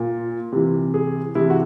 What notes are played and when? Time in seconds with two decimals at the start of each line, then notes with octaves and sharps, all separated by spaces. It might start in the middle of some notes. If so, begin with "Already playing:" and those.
Already playing: A#2
0.52 C3 E3
0.94 G#4
1.35 C3 E3 E4
1.50 F#4